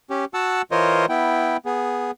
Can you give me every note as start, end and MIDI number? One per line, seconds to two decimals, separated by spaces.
0.10 0.25 61
0.10 0.25 67
0.34 0.62 66
0.34 0.62 78
0.34 0.62 81
0.34 0.62 88
0.72 1.06 52
0.72 1.06 65
0.72 1.06 70
0.72 1.06 72
0.72 1.06 73
0.72 1.06 75
1.09 1.57 59
1.09 1.57 64
1.09 1.57 79
1.65 2.11 59
1.65 2.11 68